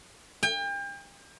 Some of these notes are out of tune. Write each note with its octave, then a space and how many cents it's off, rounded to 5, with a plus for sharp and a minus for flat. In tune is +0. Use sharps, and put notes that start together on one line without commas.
G5 +35